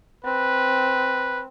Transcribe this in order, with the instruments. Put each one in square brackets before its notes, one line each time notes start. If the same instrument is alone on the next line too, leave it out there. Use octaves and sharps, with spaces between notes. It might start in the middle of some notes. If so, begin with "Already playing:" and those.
[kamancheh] C4 [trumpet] B4